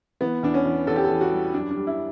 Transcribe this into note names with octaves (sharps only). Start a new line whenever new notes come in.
E3 B3
E2 D4
C#4
E3
E2 A4
G4
A4
E3
F#4
G3
F#2 D4
D4
G3
E4